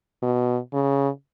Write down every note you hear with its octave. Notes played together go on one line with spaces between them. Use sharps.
B2
C#3